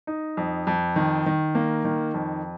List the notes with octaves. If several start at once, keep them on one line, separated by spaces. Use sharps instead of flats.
D#4
F2
F2
D#3
D#3
A#3
D#3
F2